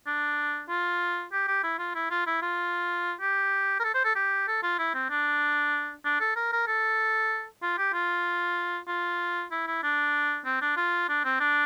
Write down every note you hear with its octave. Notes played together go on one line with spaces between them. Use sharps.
D4
F4
G4
G4
E4
F4
E4
F4
E4
F4
G4
A#4
A4
C5
A4
G4
A4
F4
E4
C4
D4
D4
A4
A#4
A#4
A4
F4
G4
F4
F4
E4
E4
D4
C4
D4
F4
D4
C4
D4